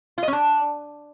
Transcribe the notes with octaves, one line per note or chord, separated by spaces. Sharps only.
F4
D#5
C#4
D4